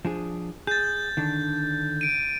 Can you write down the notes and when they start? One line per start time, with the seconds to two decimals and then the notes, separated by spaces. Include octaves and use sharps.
0.05 F3 D4 G#4
0.67 G#4 G6 A6
1.17 D3 D#3 D4
2.01 D7 D#7